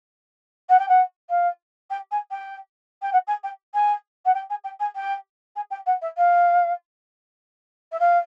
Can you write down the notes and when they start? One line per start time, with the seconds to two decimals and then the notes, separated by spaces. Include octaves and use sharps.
0.69 F#5
0.79 G5
0.89 F#5
1.29 F5
1.90 G5
2.11 G#5
2.31 G5
3.02 G5
3.13 F#5
3.27 G#5
3.43 G5
3.74 G#5
4.25 F#5
4.34 G5
4.50 G#5
4.64 G5
4.80 G#5
4.95 G5
5.56 G#5
5.70 G5
5.86 F#5
6.02 E5
6.17 F5
7.92 E5
8.00 F5